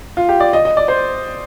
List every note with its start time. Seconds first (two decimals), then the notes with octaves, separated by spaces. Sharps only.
0.17 F4
0.29 G4
0.40 D5
0.53 D#5
0.65 D#5
0.77 D5
0.88 C5